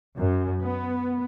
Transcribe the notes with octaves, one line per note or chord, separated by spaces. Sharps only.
F#2
B3